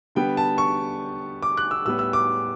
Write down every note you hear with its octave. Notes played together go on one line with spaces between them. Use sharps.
D3 G3 B3 G5
A5
C#6
D6
F#6
E6
A2 G3 B3 E6
E6
D6